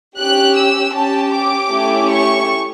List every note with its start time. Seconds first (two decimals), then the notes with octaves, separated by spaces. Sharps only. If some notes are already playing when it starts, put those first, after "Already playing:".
0.18 C#4 G4 F#6
0.56 E6
0.95 C#4 G4 A5
1.34 D6
1.72 A3 C#4 E4 G4
2.11 C#6